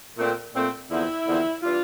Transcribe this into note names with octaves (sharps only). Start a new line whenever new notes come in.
A#2 A3 C4
A#2 A3 C4
E2 D3 F3 C4 E4
E2 D3 F3 C4
E3 G3 D4 F4